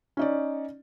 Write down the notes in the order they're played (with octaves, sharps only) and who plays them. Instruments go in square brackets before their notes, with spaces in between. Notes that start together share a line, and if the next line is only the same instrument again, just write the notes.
[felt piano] C#4 D#4 D5